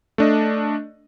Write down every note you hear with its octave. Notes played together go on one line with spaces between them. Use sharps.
A3 D4 D#5